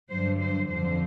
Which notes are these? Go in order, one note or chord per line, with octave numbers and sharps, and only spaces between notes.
G2 D3 F#3 C5
C5
F2 D3 F3 C5